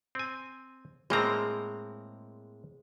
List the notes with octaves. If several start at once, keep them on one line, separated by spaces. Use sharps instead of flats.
C4 G#5
A2 G#3 A#3 C4 A#5